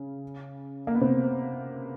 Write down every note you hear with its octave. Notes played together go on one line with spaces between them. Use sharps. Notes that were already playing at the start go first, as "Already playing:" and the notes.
Already playing: C#3
A#3
B3
C3 C4